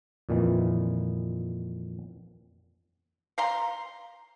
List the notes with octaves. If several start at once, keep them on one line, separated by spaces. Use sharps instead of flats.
F2 A#2 D#3 E3
F5 A#5 C6